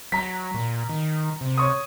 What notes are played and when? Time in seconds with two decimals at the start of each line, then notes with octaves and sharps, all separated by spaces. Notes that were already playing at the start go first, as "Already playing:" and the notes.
0.12 F#3 A#5 B6
0.54 A#2
0.90 D#3
1.41 C3
1.57 C#5 C#6 D#6